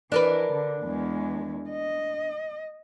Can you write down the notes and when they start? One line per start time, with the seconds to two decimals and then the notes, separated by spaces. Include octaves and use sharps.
0.12 E3 D4 A#4 B4
0.52 D3
0.84 E2 G#3
1.69 D#5